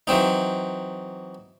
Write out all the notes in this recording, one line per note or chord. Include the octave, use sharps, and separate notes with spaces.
E3 F#3 C4 D#4